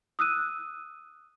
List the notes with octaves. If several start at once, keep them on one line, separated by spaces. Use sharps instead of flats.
D#6 E6 F#6 D#7